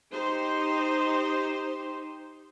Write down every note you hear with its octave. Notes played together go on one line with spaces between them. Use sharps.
D#4 G4 C5